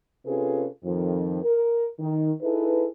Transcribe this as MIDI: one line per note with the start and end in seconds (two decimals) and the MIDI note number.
0.25 0.66 48
0.25 0.66 61
0.25 0.66 65
0.25 0.66 68
0.25 0.66 69
0.25 0.66 71
0.83 1.41 41
0.83 1.41 51
0.83 1.41 53
1.43 1.86 70
1.99 2.31 51
2.42 2.86 63
2.42 2.86 64
2.42 2.86 68
2.42 2.86 69
2.42 2.86 71